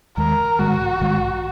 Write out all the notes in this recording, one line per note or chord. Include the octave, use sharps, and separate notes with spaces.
D#2 D#3 G#3 A#4
A#1 G#2 D#3 G#3 F#4
A#1 G#2 D#3 G#3